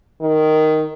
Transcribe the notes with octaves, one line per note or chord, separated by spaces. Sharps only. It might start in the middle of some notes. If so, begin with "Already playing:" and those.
D#3